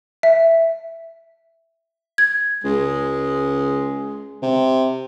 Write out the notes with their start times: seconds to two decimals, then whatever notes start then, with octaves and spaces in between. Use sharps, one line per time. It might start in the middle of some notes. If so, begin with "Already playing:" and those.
0.23 E5
2.18 G#6
2.64 C#2 G#3
4.43 C3